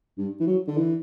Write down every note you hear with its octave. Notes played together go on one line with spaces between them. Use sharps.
G2
E3
F#3
D3
E3